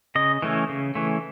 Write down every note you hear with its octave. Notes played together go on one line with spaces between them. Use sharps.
C#3 D#5
E3 A3 C#4
C#3
E3 A3 C#4